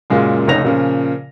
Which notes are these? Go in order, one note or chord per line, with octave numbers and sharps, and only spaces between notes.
F#2 A#2 C#3 G#3 F4
F1 C#2 D#4 C#5 A#6 F7
A#2 C#3 F3